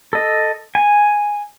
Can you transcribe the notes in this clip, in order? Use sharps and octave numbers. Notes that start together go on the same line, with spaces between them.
A4 D#5
G#5